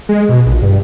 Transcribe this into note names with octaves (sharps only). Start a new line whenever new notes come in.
G#3
B2
A#1
G2